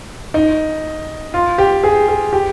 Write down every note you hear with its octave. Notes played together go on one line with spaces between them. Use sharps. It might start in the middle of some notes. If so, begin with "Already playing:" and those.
D#4
F4
G4
G#4
G#4
G4